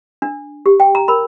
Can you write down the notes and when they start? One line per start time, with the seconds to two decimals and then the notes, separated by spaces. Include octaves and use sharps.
0.22 D4
0.66 G4
0.80 G5
0.95 A#5
1.08 A#4 B5